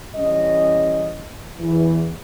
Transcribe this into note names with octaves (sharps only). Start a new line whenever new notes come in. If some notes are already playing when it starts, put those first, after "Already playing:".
E3 G3 C#4 D#5
E2 E3